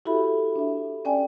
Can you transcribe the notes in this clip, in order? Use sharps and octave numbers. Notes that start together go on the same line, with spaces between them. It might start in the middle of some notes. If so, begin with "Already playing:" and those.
E4 F#4 G4 A4 E5 B5
D4 E5
C#4 D5 G5 G#5